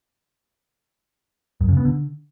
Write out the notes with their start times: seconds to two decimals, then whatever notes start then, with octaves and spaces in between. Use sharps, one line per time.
1.61 F#2
1.69 C#3
1.77 B3
1.85 D3